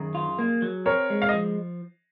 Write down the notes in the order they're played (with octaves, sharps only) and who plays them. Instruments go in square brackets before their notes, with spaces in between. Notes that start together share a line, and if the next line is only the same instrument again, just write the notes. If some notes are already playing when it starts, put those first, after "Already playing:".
Already playing: [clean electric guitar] F#2 D#3 [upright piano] G#4
[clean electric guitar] F4
A#3
F#3
[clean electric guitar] C4 [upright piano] A#4 C#5
[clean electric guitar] G#3
[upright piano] F5
D#5
[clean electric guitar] F3